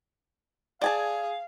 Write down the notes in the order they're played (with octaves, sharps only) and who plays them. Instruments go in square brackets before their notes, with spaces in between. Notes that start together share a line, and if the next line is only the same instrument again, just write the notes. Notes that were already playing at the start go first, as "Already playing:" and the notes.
[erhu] G#4 [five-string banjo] D5 G#5 A5 [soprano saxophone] F5